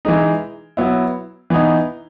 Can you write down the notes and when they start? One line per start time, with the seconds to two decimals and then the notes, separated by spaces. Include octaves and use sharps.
0.05 E3 G#3 D#4
0.77 F#3 B3 E4
1.50 E3 B3 D#4